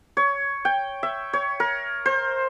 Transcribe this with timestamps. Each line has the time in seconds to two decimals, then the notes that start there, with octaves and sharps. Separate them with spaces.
0.17 C#5
0.65 G5
1.03 E5
1.33 C#5
1.60 A#4
2.06 C5